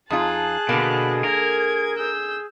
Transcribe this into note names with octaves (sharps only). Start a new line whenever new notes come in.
F2 D#4 F4 G#4 A5 F#6
B2 D3 A#3
A#4 G#6
G#4 E6 G6